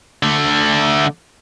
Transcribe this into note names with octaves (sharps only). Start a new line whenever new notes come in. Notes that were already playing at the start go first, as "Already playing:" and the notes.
D3 A3